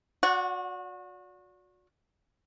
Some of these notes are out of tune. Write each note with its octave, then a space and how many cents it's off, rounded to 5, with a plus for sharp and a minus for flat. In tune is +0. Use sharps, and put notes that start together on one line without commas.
F#4 -30 D5 -25 F#5 +0